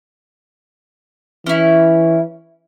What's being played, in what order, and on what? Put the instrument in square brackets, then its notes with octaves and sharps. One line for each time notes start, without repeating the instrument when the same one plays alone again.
[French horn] E3 [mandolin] C#4 E4